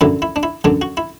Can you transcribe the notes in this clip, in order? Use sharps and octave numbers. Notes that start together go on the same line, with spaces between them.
F#2 D3 F#3 E4
E4
D4
E4
F#2 D3 F#3 D4
F#4
E4